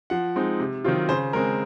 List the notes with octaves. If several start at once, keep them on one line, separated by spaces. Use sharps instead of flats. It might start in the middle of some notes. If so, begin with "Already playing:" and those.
F3 F#5
G#3 C4 D#4
C3
D#3 F#3 C4 F4
C#3 C5
G#3 C4 A#4